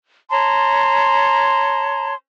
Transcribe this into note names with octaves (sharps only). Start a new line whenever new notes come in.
C#5 A5 A#5 C6